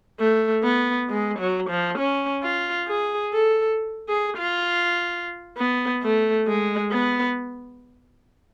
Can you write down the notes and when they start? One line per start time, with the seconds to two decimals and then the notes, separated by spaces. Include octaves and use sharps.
0.20 A3
0.64 B3
1.10 G#3
1.39 F#3
1.70 F3
1.98 C#4
2.43 F4
2.88 G#4
3.34 A4
4.09 G#4
4.37 F4
5.58 B3
6.03 A3
6.48 G#3
6.92 B3